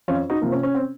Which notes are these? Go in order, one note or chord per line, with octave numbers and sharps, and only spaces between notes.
F2 C#4 F4
D#4 F#4
C3 F3 A#3
C#4
C#4
C4